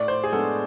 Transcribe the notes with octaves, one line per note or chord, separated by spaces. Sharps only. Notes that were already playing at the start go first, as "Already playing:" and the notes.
Already playing: A2 D5
C5
G#4
G#3 B3 D4 A4